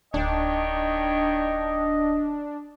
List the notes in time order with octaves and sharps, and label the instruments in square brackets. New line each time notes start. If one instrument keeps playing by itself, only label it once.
[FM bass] D1 [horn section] D#3 C#5 G5 [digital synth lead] D4 [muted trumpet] D#5